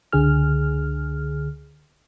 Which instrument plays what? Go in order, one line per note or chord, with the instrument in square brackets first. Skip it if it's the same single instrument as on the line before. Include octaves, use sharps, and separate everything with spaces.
[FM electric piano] C#2 D3 G#4 F6